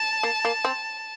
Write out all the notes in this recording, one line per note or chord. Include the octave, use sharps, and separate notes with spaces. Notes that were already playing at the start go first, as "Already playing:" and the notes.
Already playing: A5
A#3
A#3
C4